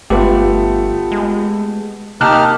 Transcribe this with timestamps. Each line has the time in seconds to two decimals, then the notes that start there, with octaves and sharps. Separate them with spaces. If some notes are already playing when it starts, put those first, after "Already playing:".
0.10 G1 A3 B3 F4 G4
1.11 G#3
2.21 C3 A#3 D#4 G4 A5 F6 F#6